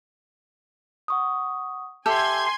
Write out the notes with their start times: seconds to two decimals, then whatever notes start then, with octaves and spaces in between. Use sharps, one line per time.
1.08 F#5 C#6 D#6
2.06 G4 A4 E5 G#5 C6 G6 G#6